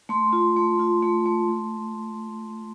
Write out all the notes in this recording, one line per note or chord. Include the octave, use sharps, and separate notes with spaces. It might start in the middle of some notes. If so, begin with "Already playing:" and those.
A3 C6
F4
A3
F4
A3
A3
A3